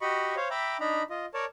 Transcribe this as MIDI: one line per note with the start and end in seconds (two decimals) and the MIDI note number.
0.01 0.35 66
0.01 0.35 67
0.01 0.35 75
0.01 0.35 83
0.01 0.35 85
0.36 0.48 72
0.36 0.48 73
0.36 0.48 77
0.50 0.77 76
0.50 0.77 79
0.50 0.77 82
0.50 0.77 83
0.50 0.77 86
0.80 1.03 62
0.80 1.03 63
0.80 1.03 82
0.80 1.03 83
1.10 1.26 65
1.10 1.26 75
1.34 1.45 70
1.34 1.45 73
1.34 1.45 74
1.34 1.45 81